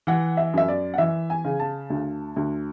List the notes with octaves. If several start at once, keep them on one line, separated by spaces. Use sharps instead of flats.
E3 F#5
E5
F#2 E5
D5
F#5
E3 E5
G#5
C#3
A5
D2
D2